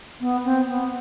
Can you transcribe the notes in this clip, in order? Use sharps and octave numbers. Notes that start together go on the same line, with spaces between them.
B3
C4
B3